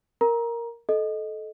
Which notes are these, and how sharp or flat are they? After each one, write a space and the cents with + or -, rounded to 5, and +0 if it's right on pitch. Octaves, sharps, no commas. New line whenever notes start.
A#4 +0 A#5 +20
A4 -20 D#5 +0